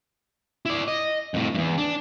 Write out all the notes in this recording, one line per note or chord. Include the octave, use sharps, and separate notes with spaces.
E4 D5
D#5
F2 A2
E2 G2
D4